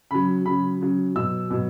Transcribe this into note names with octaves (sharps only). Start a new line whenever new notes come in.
C#3 F#3 B5
C#3 F#3 B5
C#3 F#3
B2 F#3 E6
B2 F#3